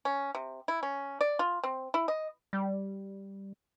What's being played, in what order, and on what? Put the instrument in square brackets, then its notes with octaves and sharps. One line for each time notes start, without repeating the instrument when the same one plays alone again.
[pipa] C#4
C3
E4
C#4
D5
F4
C4
E4
D#5
[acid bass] G3